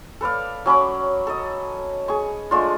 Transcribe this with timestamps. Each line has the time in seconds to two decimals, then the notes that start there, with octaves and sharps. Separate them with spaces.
0.21 A4 B4 D5 F5
0.66 F#3 C#4 B5 D6
1.27 A4 D#5
2.08 G#4 C#6
2.51 G#3 A3 D4 F4